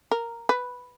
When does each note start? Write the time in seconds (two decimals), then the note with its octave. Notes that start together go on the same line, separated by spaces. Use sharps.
0.11 A#4
0.49 B4